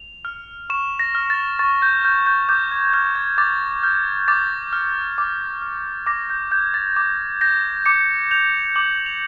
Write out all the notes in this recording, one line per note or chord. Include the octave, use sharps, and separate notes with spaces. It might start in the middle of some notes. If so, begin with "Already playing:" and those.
Already playing: F7
F6
C#6 E7
A#6
F6
A6
C#6 A6
G6
F6 G6
G6
D6 G6
G#6
F6 G6
G#6
D6 A6
F6 G6
D6 A6
F6
D6
F6
D6 A#6
G6
G6 G#6
A6
D6
G6 A#6
D6 C#7
G6 F7
D6 F#7
F7